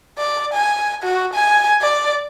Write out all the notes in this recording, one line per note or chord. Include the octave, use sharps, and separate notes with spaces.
D5
G#5
F#4
G#5
D5